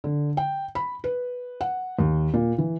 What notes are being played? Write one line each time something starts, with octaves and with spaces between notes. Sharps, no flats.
D3
G5
B5
B4
F#5
D#2
A#2
E3